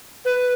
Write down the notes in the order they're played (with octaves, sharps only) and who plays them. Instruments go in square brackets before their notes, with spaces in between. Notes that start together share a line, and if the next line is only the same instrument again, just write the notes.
[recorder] B4